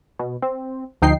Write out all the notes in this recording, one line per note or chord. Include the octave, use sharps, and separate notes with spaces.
B2
C4
D2 F3 D#4 G5 C7